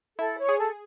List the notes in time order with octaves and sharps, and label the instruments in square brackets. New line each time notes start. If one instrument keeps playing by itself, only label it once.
[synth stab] E4 [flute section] A4
[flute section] C#5
[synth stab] G#4
[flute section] A4